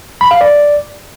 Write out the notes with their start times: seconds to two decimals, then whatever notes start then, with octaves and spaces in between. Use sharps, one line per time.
0.21 B5
0.31 F5
0.41 D5